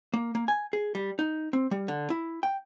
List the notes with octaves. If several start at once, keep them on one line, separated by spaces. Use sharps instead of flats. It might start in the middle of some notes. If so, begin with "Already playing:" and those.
A#3
A#3
G#5
G#4
G3
D#4
C4
G3
D3
E4
G5